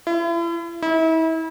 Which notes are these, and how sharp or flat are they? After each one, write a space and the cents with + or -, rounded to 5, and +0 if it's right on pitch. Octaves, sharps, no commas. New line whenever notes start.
E4 +40
E4 -35